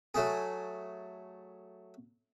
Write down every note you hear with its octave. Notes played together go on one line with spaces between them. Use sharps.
F#3 A3 G#4